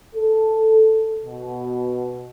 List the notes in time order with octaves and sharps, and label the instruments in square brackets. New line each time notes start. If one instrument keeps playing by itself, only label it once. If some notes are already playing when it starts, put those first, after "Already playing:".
[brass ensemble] A4
B2